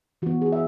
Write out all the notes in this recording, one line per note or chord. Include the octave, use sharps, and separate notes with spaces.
E3 B3 F#4
G#4
E5